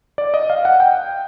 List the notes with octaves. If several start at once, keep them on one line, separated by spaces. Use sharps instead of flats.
D5
D#5
F5
F#5
G5